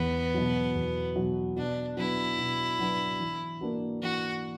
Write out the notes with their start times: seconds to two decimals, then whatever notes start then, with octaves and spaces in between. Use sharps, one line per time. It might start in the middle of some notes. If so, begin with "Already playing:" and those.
Already playing: E2 B3
0.35 B2 F#3
0.75 E2
1.16 B2 F#3
1.57 B2 D4
1.97 F#3 B3 D4 E4
2.38 B2
2.79 F#3 B3 D4
3.20 E3
3.61 A#3 D4 F#4
4.02 E3 F#4